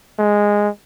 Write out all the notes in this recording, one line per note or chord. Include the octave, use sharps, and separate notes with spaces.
G#3